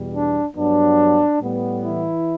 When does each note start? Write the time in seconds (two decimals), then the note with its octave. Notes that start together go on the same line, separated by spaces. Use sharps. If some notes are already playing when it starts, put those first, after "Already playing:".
Already playing: E2 B2 G3
0.14 D4
0.56 G2 F#3 B3 D4
1.40 A2 G3 B3
1.82 E3 E4